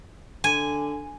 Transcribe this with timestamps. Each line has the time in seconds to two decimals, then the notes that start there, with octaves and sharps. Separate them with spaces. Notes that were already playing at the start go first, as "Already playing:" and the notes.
0.44 D3 G#5